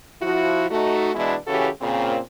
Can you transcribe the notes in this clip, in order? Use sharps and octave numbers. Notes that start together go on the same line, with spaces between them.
F3 E4 F#4
A3 D#4 F#4
B2 E3 G#3 B3 D4 E4
C#3 E3 C#4 F#4 G4 A4
A#2 C#3 C4